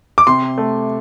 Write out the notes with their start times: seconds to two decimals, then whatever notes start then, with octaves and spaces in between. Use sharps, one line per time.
0.18 D6
0.27 C3 C6
0.58 A3